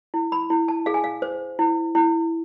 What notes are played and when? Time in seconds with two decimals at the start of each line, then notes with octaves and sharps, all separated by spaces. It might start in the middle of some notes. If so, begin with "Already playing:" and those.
0.14 E4
0.32 B5
0.50 E4
0.68 A5
0.86 G#4 F5
0.94 G#5
1.04 F5
1.22 C5
1.59 E4
1.95 E4